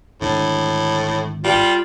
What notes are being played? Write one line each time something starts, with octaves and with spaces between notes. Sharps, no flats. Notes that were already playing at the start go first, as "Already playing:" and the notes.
G#1 A2 D3 D4
G3 F4